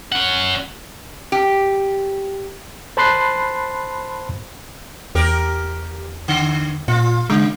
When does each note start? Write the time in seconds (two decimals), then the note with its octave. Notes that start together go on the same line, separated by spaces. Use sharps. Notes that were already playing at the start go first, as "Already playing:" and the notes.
0.12 C#4 F#5
1.32 G4
2.97 C5 A5 B5 C6 F#6 C7
5.15 E2 G4 A#4
6.28 D3
6.88 A#2 F4
7.30 C#3 G#3